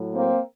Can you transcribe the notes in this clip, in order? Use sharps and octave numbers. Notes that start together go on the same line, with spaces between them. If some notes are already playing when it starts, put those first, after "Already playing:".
Already playing: A2 F#3
A#3 C4